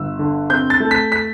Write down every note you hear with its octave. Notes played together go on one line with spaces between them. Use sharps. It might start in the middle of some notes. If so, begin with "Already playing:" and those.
Already playing: G1 E6
D3
C4 G6
A6
A3
B6
B6